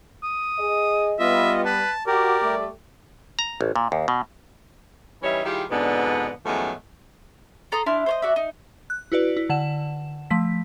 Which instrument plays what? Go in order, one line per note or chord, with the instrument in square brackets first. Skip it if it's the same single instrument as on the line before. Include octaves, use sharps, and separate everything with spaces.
[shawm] D#6
[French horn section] G#4 D#5
[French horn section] G3 B3 [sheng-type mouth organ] F4 D#5 [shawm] E5
[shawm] B4 [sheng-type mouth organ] A5
[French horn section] F#4 [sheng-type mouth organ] G4 A#4 [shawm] D5
[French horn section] G3 A3
[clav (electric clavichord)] A#5
A1
A#2
D#2
B2
[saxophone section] E3 G3 C#4 D#4 C#5 E5
D#3 G3 E4 F4 G4 G#4
F2 G#2 B2 D3 B3 D4
F#2 D#3 F3 G#3 A3 B3
[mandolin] A4 A#5 C6 D#6
D4 E4 F5 C6
C5 C#5 D#5
F#4 D5 E5
D#4
[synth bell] F#6
E4 F#4 B4 D5
E4
D3 F#5 E7
F3 A3 B6